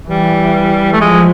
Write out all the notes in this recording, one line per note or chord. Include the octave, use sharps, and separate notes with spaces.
E3 G3
A3
F3 G#3